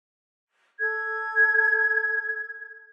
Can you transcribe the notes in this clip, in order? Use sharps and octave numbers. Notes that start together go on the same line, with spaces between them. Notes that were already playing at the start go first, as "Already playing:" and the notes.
A4 G#6